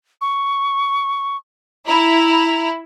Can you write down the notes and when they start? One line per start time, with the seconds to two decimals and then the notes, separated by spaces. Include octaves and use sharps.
0.21 C#6
1.87 E4 A#5